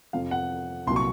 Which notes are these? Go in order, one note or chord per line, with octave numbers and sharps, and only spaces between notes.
F2 C3 F3 F5
F#5
C2 A#2 F#3 C6
C#6